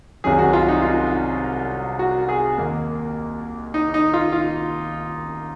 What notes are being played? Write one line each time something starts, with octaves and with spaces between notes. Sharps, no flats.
C2 C3 D#3 F#3 C#4 G#4
F#4
F4
D#4
F4
F#4
G#4
D#2 D#3 A#3
D#4
D#4
F4
F4